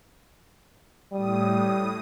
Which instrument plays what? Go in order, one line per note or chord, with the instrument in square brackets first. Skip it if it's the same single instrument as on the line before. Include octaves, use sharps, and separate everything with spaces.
[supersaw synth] A2 D#6 [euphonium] G3